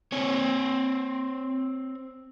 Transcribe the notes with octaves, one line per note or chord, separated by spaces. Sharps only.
C4 C#5